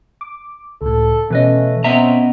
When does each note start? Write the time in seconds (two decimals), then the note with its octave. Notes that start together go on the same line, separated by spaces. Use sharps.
0.21 D6
0.82 C#2 A2 A4
1.30 B2 E3 A3 C#4 B4 D#5
1.84 B3 C4 D#5 E5 A#5